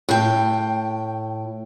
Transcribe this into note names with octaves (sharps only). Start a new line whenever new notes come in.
A2 G5